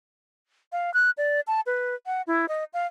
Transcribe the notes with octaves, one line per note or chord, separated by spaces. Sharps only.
F5
F#6
D5
A5
B4
F#5
E4
D#5
F5